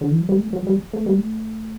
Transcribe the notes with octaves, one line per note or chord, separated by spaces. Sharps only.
D3
E3
F#3
G3
A3
F#3
G3
A3
G3
A3